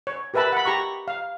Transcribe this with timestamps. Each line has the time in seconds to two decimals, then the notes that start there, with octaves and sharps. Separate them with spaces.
0.07 C#5
0.34 G4 A#4 B4 E5 A5 B5
0.53 F#5 B5
0.66 G4 A#5 C#6
1.08 F5